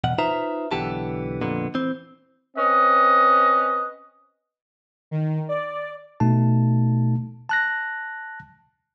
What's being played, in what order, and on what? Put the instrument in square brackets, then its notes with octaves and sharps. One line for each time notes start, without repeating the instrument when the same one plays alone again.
[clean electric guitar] E2 B2 F#5
D#4 F4 B4 C5 E5 A#5
B1 D3 E3 B3 G4 A5
F2 A#2 D3 B3
E3 C4
[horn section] C4 C#4 B4 D#5
[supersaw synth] D#3
D5
[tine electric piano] B2 A3 D#4 A5
A5 F#6 A#6